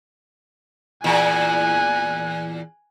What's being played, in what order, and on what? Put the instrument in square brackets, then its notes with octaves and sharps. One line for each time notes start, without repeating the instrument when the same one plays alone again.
[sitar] E2 A#2 [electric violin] G#5 F#6